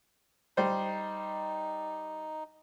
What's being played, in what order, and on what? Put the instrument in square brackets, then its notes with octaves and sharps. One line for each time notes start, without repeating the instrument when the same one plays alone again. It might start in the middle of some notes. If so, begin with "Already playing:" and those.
[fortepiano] G3 C5 [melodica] D#4